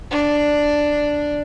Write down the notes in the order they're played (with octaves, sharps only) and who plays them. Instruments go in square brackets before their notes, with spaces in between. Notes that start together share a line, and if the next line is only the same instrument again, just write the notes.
[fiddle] D4